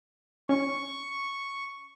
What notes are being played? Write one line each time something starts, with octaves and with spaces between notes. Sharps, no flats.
C#4 C#6